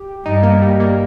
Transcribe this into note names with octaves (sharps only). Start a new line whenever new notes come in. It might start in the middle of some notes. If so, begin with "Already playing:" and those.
Already playing: G4
G2 D#4
A#3
G3
A#3